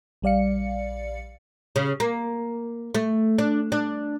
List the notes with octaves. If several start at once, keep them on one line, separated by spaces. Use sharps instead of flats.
A#1 G3 D5 F5 C#7
C#3
A#3
A3
D4
D4